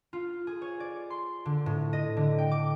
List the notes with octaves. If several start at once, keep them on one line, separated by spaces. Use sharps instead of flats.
F4
G#4
C#5
D5
C6
D3
A2
D#5
D3
G5
D6